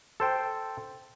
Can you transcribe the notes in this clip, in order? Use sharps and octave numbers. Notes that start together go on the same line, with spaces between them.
A4 C5 G5